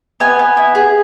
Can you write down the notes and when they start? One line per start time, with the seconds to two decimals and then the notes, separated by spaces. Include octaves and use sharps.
0.20 B3 G#5
0.39 B3
0.57 E4
0.75 G#4